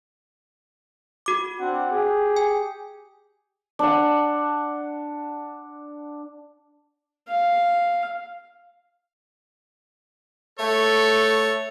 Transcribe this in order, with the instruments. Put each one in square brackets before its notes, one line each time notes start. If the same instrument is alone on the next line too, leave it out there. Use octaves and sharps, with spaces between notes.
[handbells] F#4 D6
[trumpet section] C4 D4 F#5
G4 G#4
[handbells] G#5
[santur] D4 F#5
[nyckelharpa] F5
[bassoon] A3 [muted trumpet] A4 [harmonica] C#5